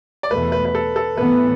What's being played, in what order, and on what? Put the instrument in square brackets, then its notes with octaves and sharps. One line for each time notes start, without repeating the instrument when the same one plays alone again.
[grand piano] D5
[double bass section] E2 B2 A3 [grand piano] B4
[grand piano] B4
B4
A4
A4
[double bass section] A2 E3 B3 [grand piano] B4